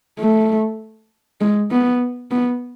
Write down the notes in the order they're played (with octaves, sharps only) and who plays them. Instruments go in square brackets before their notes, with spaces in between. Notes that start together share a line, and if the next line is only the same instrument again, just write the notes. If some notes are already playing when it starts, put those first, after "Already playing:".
[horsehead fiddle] A3
G#3
B3
B3